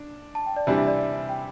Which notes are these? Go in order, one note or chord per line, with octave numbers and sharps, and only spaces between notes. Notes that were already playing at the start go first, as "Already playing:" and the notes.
Already playing: D4
A5
G5
D5
C3 E3 G3 D4
E5
D5
E5
E5
G5